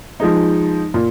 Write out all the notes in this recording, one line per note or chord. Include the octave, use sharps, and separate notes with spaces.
F3 G#3 D#4
A#2